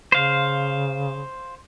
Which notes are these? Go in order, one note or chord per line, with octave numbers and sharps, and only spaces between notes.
C#3 C5 F5